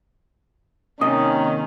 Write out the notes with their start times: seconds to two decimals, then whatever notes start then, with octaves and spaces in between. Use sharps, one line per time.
1.01 D#2 C3 D#3 C#4 D#5